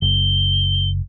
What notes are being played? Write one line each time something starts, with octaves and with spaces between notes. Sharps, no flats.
F#1 G7